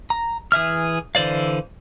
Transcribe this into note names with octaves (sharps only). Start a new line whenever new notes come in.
A#5
E3 G#4 E5 F6
D3 E3 C5 D5 F5